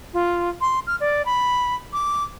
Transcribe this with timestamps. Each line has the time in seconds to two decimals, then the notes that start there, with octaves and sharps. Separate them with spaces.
0.13 F4
0.61 C6
0.87 F6
1.00 D5
1.26 B5
1.93 D6